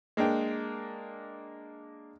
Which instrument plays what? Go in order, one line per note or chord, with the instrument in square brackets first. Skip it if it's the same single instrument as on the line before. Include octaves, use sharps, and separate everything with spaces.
[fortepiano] G#3 A#3 D4 G5